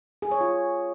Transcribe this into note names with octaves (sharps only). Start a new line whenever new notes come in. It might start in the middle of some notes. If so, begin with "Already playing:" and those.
G#4
C#5
F4